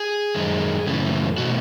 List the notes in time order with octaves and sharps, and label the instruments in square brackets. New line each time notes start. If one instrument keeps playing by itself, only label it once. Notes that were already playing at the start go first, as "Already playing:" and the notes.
Already playing: [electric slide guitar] G#4
F#2 D#3 G#3
F#2 C#3 E3 A3
B2 A3 F#4